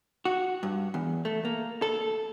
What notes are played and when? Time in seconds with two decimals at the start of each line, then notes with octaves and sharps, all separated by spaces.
0.25 F#4
0.63 G2
0.94 E2
1.25 A3
1.45 A#3
1.82 A4